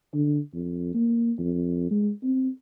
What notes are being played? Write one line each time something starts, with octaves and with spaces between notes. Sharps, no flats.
D3
F2
A#3
F2
G#3
C4